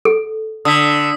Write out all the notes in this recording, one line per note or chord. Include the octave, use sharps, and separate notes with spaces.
A4
D3 D#6 E6 B6